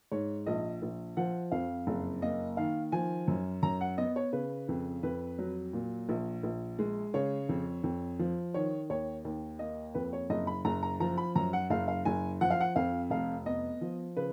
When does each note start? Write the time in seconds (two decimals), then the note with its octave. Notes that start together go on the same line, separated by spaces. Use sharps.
0.12 G#2 C#5
0.46 A#1 D#5
0.82 A#1
1.17 F3 F#5
1.52 F2 F5
1.87 F#1
2.22 A#3 D#5
2.57 D#3 F5
2.92 F3 G#5
3.28 F#2
3.63 F#2 A#5
3.81 F#5
3.98 B3 D#5
4.16 C#5
4.33 C#3 B4
4.69 F2
5.03 F2 B4
5.39 F#3
5.73 A#2
6.09 A#1
6.43 A#1
6.79 G#3
7.14 C#3 C#5
7.49 F2
7.84 F2
8.19 F3
8.54 D#3 C#5
8.90 D#2 C#5
9.25 D#2
9.59 A#3 D#5
9.94 F2 B4
10.13 C#5
10.30 F#1 D#5
10.47 B5
10.65 F#1 A#5
10.83 A#5
11.00 F3 A#5
11.18 B5
11.35 F#2 A#5
11.53 F#5
11.70 F#1 F5
11.88 F5
12.05 F#1 G#5
12.41 F3 F#5
12.50 F5
12.61 F#5
12.76 F2 F5
13.10 F1 F5
13.46 B3 D#5
13.81 F3
14.17 C#3 B4